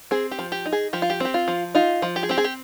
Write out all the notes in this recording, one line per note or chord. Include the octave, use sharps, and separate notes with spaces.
C4 G#4
G4
F3
G4
D#4
G#4
F3 G4
F4
G4
C4 G4
F4
F3
D#4 F4
F3
G4
G#4
C4 G4
G#4
G4